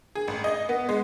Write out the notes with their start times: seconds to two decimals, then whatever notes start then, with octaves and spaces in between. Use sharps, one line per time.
0.15 G#4
0.28 A1
0.44 D#5
0.69 B3
0.89 G#3